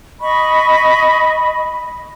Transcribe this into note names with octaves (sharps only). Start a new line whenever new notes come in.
D#5 B5 C#6